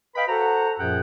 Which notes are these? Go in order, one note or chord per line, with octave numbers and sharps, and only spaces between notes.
B4 D#5 F5 G5 B5
F#4 A4 C5 F#5 A#5
F#2 A#2 F3 G#4 F#5 G5